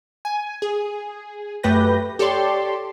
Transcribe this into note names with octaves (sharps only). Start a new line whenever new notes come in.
G#5
G#4
F#2 A3 G4 B4 G6 A#6
G4 A4 C#5 D5 C6